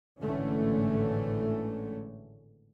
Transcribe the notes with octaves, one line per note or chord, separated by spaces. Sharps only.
G#1 A2 D3 E3 A3 C#4